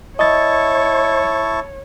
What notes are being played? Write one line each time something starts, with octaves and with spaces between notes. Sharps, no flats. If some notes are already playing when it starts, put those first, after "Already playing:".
E4 C#5 D#5 A5 C#6 A6